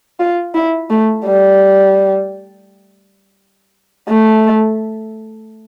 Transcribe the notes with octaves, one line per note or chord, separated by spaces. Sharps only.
F4
E4
A3
G3
A3